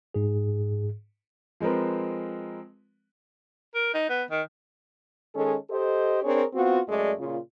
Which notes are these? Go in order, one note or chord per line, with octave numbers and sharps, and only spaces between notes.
G#2 G#4
F3 G#3 C4 A#4 B4
A#4
D#4
B3
D#3
D#3 G#3 C#4 A4
G4 A4 C5 D#5
C4 D4 G#4 A#4 C#5
B3 C4 F4 F#4
F#2 G#3 A3 D5
A#2 C#3 F4